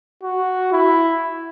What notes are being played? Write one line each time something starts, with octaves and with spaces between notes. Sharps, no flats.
F#4
E4